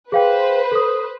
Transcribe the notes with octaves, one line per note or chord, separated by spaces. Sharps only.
G#4 B4 C5 F5 G5
A4 D#6